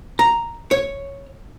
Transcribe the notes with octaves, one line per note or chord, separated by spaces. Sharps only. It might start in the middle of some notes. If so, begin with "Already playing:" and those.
A#5
C#5